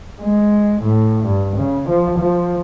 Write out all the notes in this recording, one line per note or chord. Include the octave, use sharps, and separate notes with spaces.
G#3
A2
G2
C#3
F3
F3